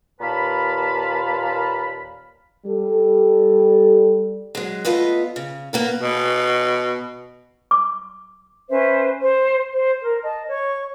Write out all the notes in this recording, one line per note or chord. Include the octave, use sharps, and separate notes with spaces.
D#2 A#2 B4 F5 A5 B5
G3 A4
F#3 G#3
A3 B3 F4 B4 D#5
C#3
A#3 B3 A#4
B2
D6
C#4 B4 C5 E5
C5
C5
A#4
D#5 A5
C#5 C#6